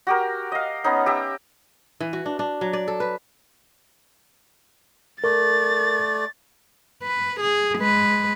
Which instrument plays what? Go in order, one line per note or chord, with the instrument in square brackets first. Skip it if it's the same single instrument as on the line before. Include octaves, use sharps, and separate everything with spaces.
[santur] F#4 G4 A#4
D#5 F5
B3 C#4 D#4
G4 E5 A#5
[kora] E3
F#4
D4
D4
F#3
D5
A4
B4
[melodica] A3 D5 [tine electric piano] A#4 [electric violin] A6
[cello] B4
G#4
G#3 B4